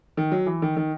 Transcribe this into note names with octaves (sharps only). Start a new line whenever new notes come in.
D#3
F#3
E3
D#3
D#3